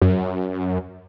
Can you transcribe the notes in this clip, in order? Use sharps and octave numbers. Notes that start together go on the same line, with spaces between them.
F#2